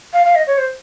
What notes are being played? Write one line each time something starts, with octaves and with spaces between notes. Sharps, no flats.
F5
F5
D#5
C#5
C5